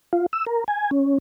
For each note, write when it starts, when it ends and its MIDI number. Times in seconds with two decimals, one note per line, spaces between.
0.13 0.26 65
0.33 0.45 88
0.47 0.64 70
0.68 0.91 80
0.91 1.18 61